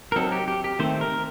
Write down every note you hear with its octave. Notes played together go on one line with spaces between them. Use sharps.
A#4
F#3 C4 D#4 A4
G4
G4
G4
D#3 A3 C4 C5
A#4